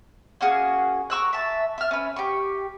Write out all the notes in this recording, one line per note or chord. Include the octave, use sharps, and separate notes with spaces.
A#3 C#4 F#4 G#4
A#4 C#6 E6 F#6
E5 A5
E5 F6
C#4 B4
G4 C#6